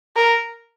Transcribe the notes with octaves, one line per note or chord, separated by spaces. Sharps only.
A#4